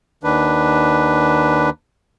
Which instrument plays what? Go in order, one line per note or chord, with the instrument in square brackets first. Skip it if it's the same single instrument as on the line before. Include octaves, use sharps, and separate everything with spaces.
[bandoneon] D#2 D#3 D4 B4